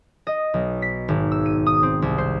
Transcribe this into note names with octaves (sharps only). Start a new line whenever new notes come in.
D#5
B1
B6
G#1
E6
D#7
D#6
C4
C2
C5